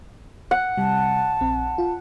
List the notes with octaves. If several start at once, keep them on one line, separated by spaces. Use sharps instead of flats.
F#5
C3 G3 A5
A#1 C4
F4